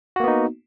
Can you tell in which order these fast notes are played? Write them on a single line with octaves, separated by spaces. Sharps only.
F#4 A#3 B3 D#4